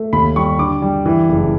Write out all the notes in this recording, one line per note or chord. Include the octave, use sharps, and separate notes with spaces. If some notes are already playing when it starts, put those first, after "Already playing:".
Already playing: A3
D#2 B5
G3 C#6
D3 D6
G3
E3
F#1